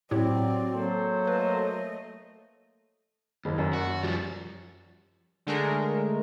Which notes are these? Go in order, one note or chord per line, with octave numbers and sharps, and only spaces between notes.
A2 F#3 C4 E4 G4 D5
F#3 A#3 A4 C5
A3 B4 D#5
F#1 D#2
F#2
F#4
F3 G3
D3 G#3 A3 A#4